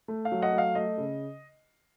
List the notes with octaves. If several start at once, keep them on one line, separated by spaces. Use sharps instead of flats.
A3
F5
F#3
D#5 F#5
A3
F5
A3 D#5
C#3